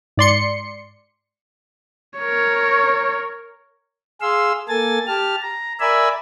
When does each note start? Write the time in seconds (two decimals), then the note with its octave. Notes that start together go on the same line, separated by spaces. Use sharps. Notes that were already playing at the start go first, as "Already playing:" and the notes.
0.17 G#2 D5 C6 C#7
2.19 A#4 C#5
4.21 G#4 F5 C6 E6
4.68 A#3 A4 G#5 A6
5.07 G4 A5 F6
5.42 A#5
5.80 A#4 D5 E5 G#5 B5 E6